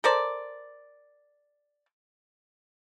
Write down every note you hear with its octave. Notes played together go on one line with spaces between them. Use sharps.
A4 A#4 C5 D5